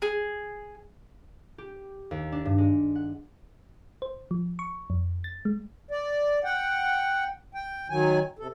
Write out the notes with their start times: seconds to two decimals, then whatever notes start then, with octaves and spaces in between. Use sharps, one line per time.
0.02 G#4
1.58 G4
2.11 D#2
2.32 D4
2.45 G2
2.58 G#3
2.95 F#5
4.02 C5
4.31 F3
4.59 C#6
4.90 F2
5.24 A6
5.45 G#3
5.91 D5
6.44 F#5 G5
7.55 G5
7.90 D#3 F#3 G#5
8.39 C3 A4